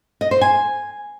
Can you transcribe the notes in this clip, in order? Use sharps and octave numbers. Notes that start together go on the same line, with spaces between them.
D#5
C5
G#5